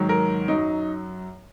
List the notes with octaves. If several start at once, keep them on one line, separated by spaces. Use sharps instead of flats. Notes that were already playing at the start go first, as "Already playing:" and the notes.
Already playing: G#2 D#3 F#3
A#4
F#2 F#3 D#4